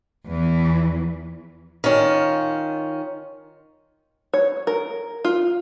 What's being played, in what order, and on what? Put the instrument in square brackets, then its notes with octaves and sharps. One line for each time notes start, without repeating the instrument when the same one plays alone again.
[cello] E2 E3
[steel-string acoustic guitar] D#3 C#4 F4
[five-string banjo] C#5
A#4
F4